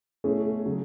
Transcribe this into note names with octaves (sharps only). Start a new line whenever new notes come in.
B2 A3 C#4 E4 G#4
C#3 F#3